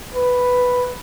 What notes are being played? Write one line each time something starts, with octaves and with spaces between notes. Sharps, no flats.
B4